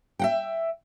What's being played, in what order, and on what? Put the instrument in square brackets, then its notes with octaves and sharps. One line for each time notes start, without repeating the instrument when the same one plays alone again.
[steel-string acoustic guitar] E5 F#5 G5